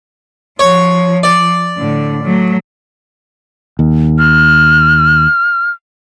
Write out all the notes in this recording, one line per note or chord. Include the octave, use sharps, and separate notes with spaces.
F3 C#5
D5
A2 D3
F#3 A3
D#2
F6